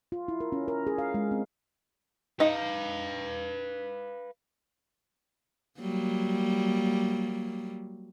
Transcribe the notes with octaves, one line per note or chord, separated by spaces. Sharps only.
F4
E4
A#4
C#4
A#4
G#4
F5
G#3
C4
D#4 B4 D#5 F5
F#3 G3 A#3